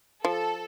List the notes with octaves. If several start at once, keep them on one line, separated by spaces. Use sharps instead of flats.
F3 A4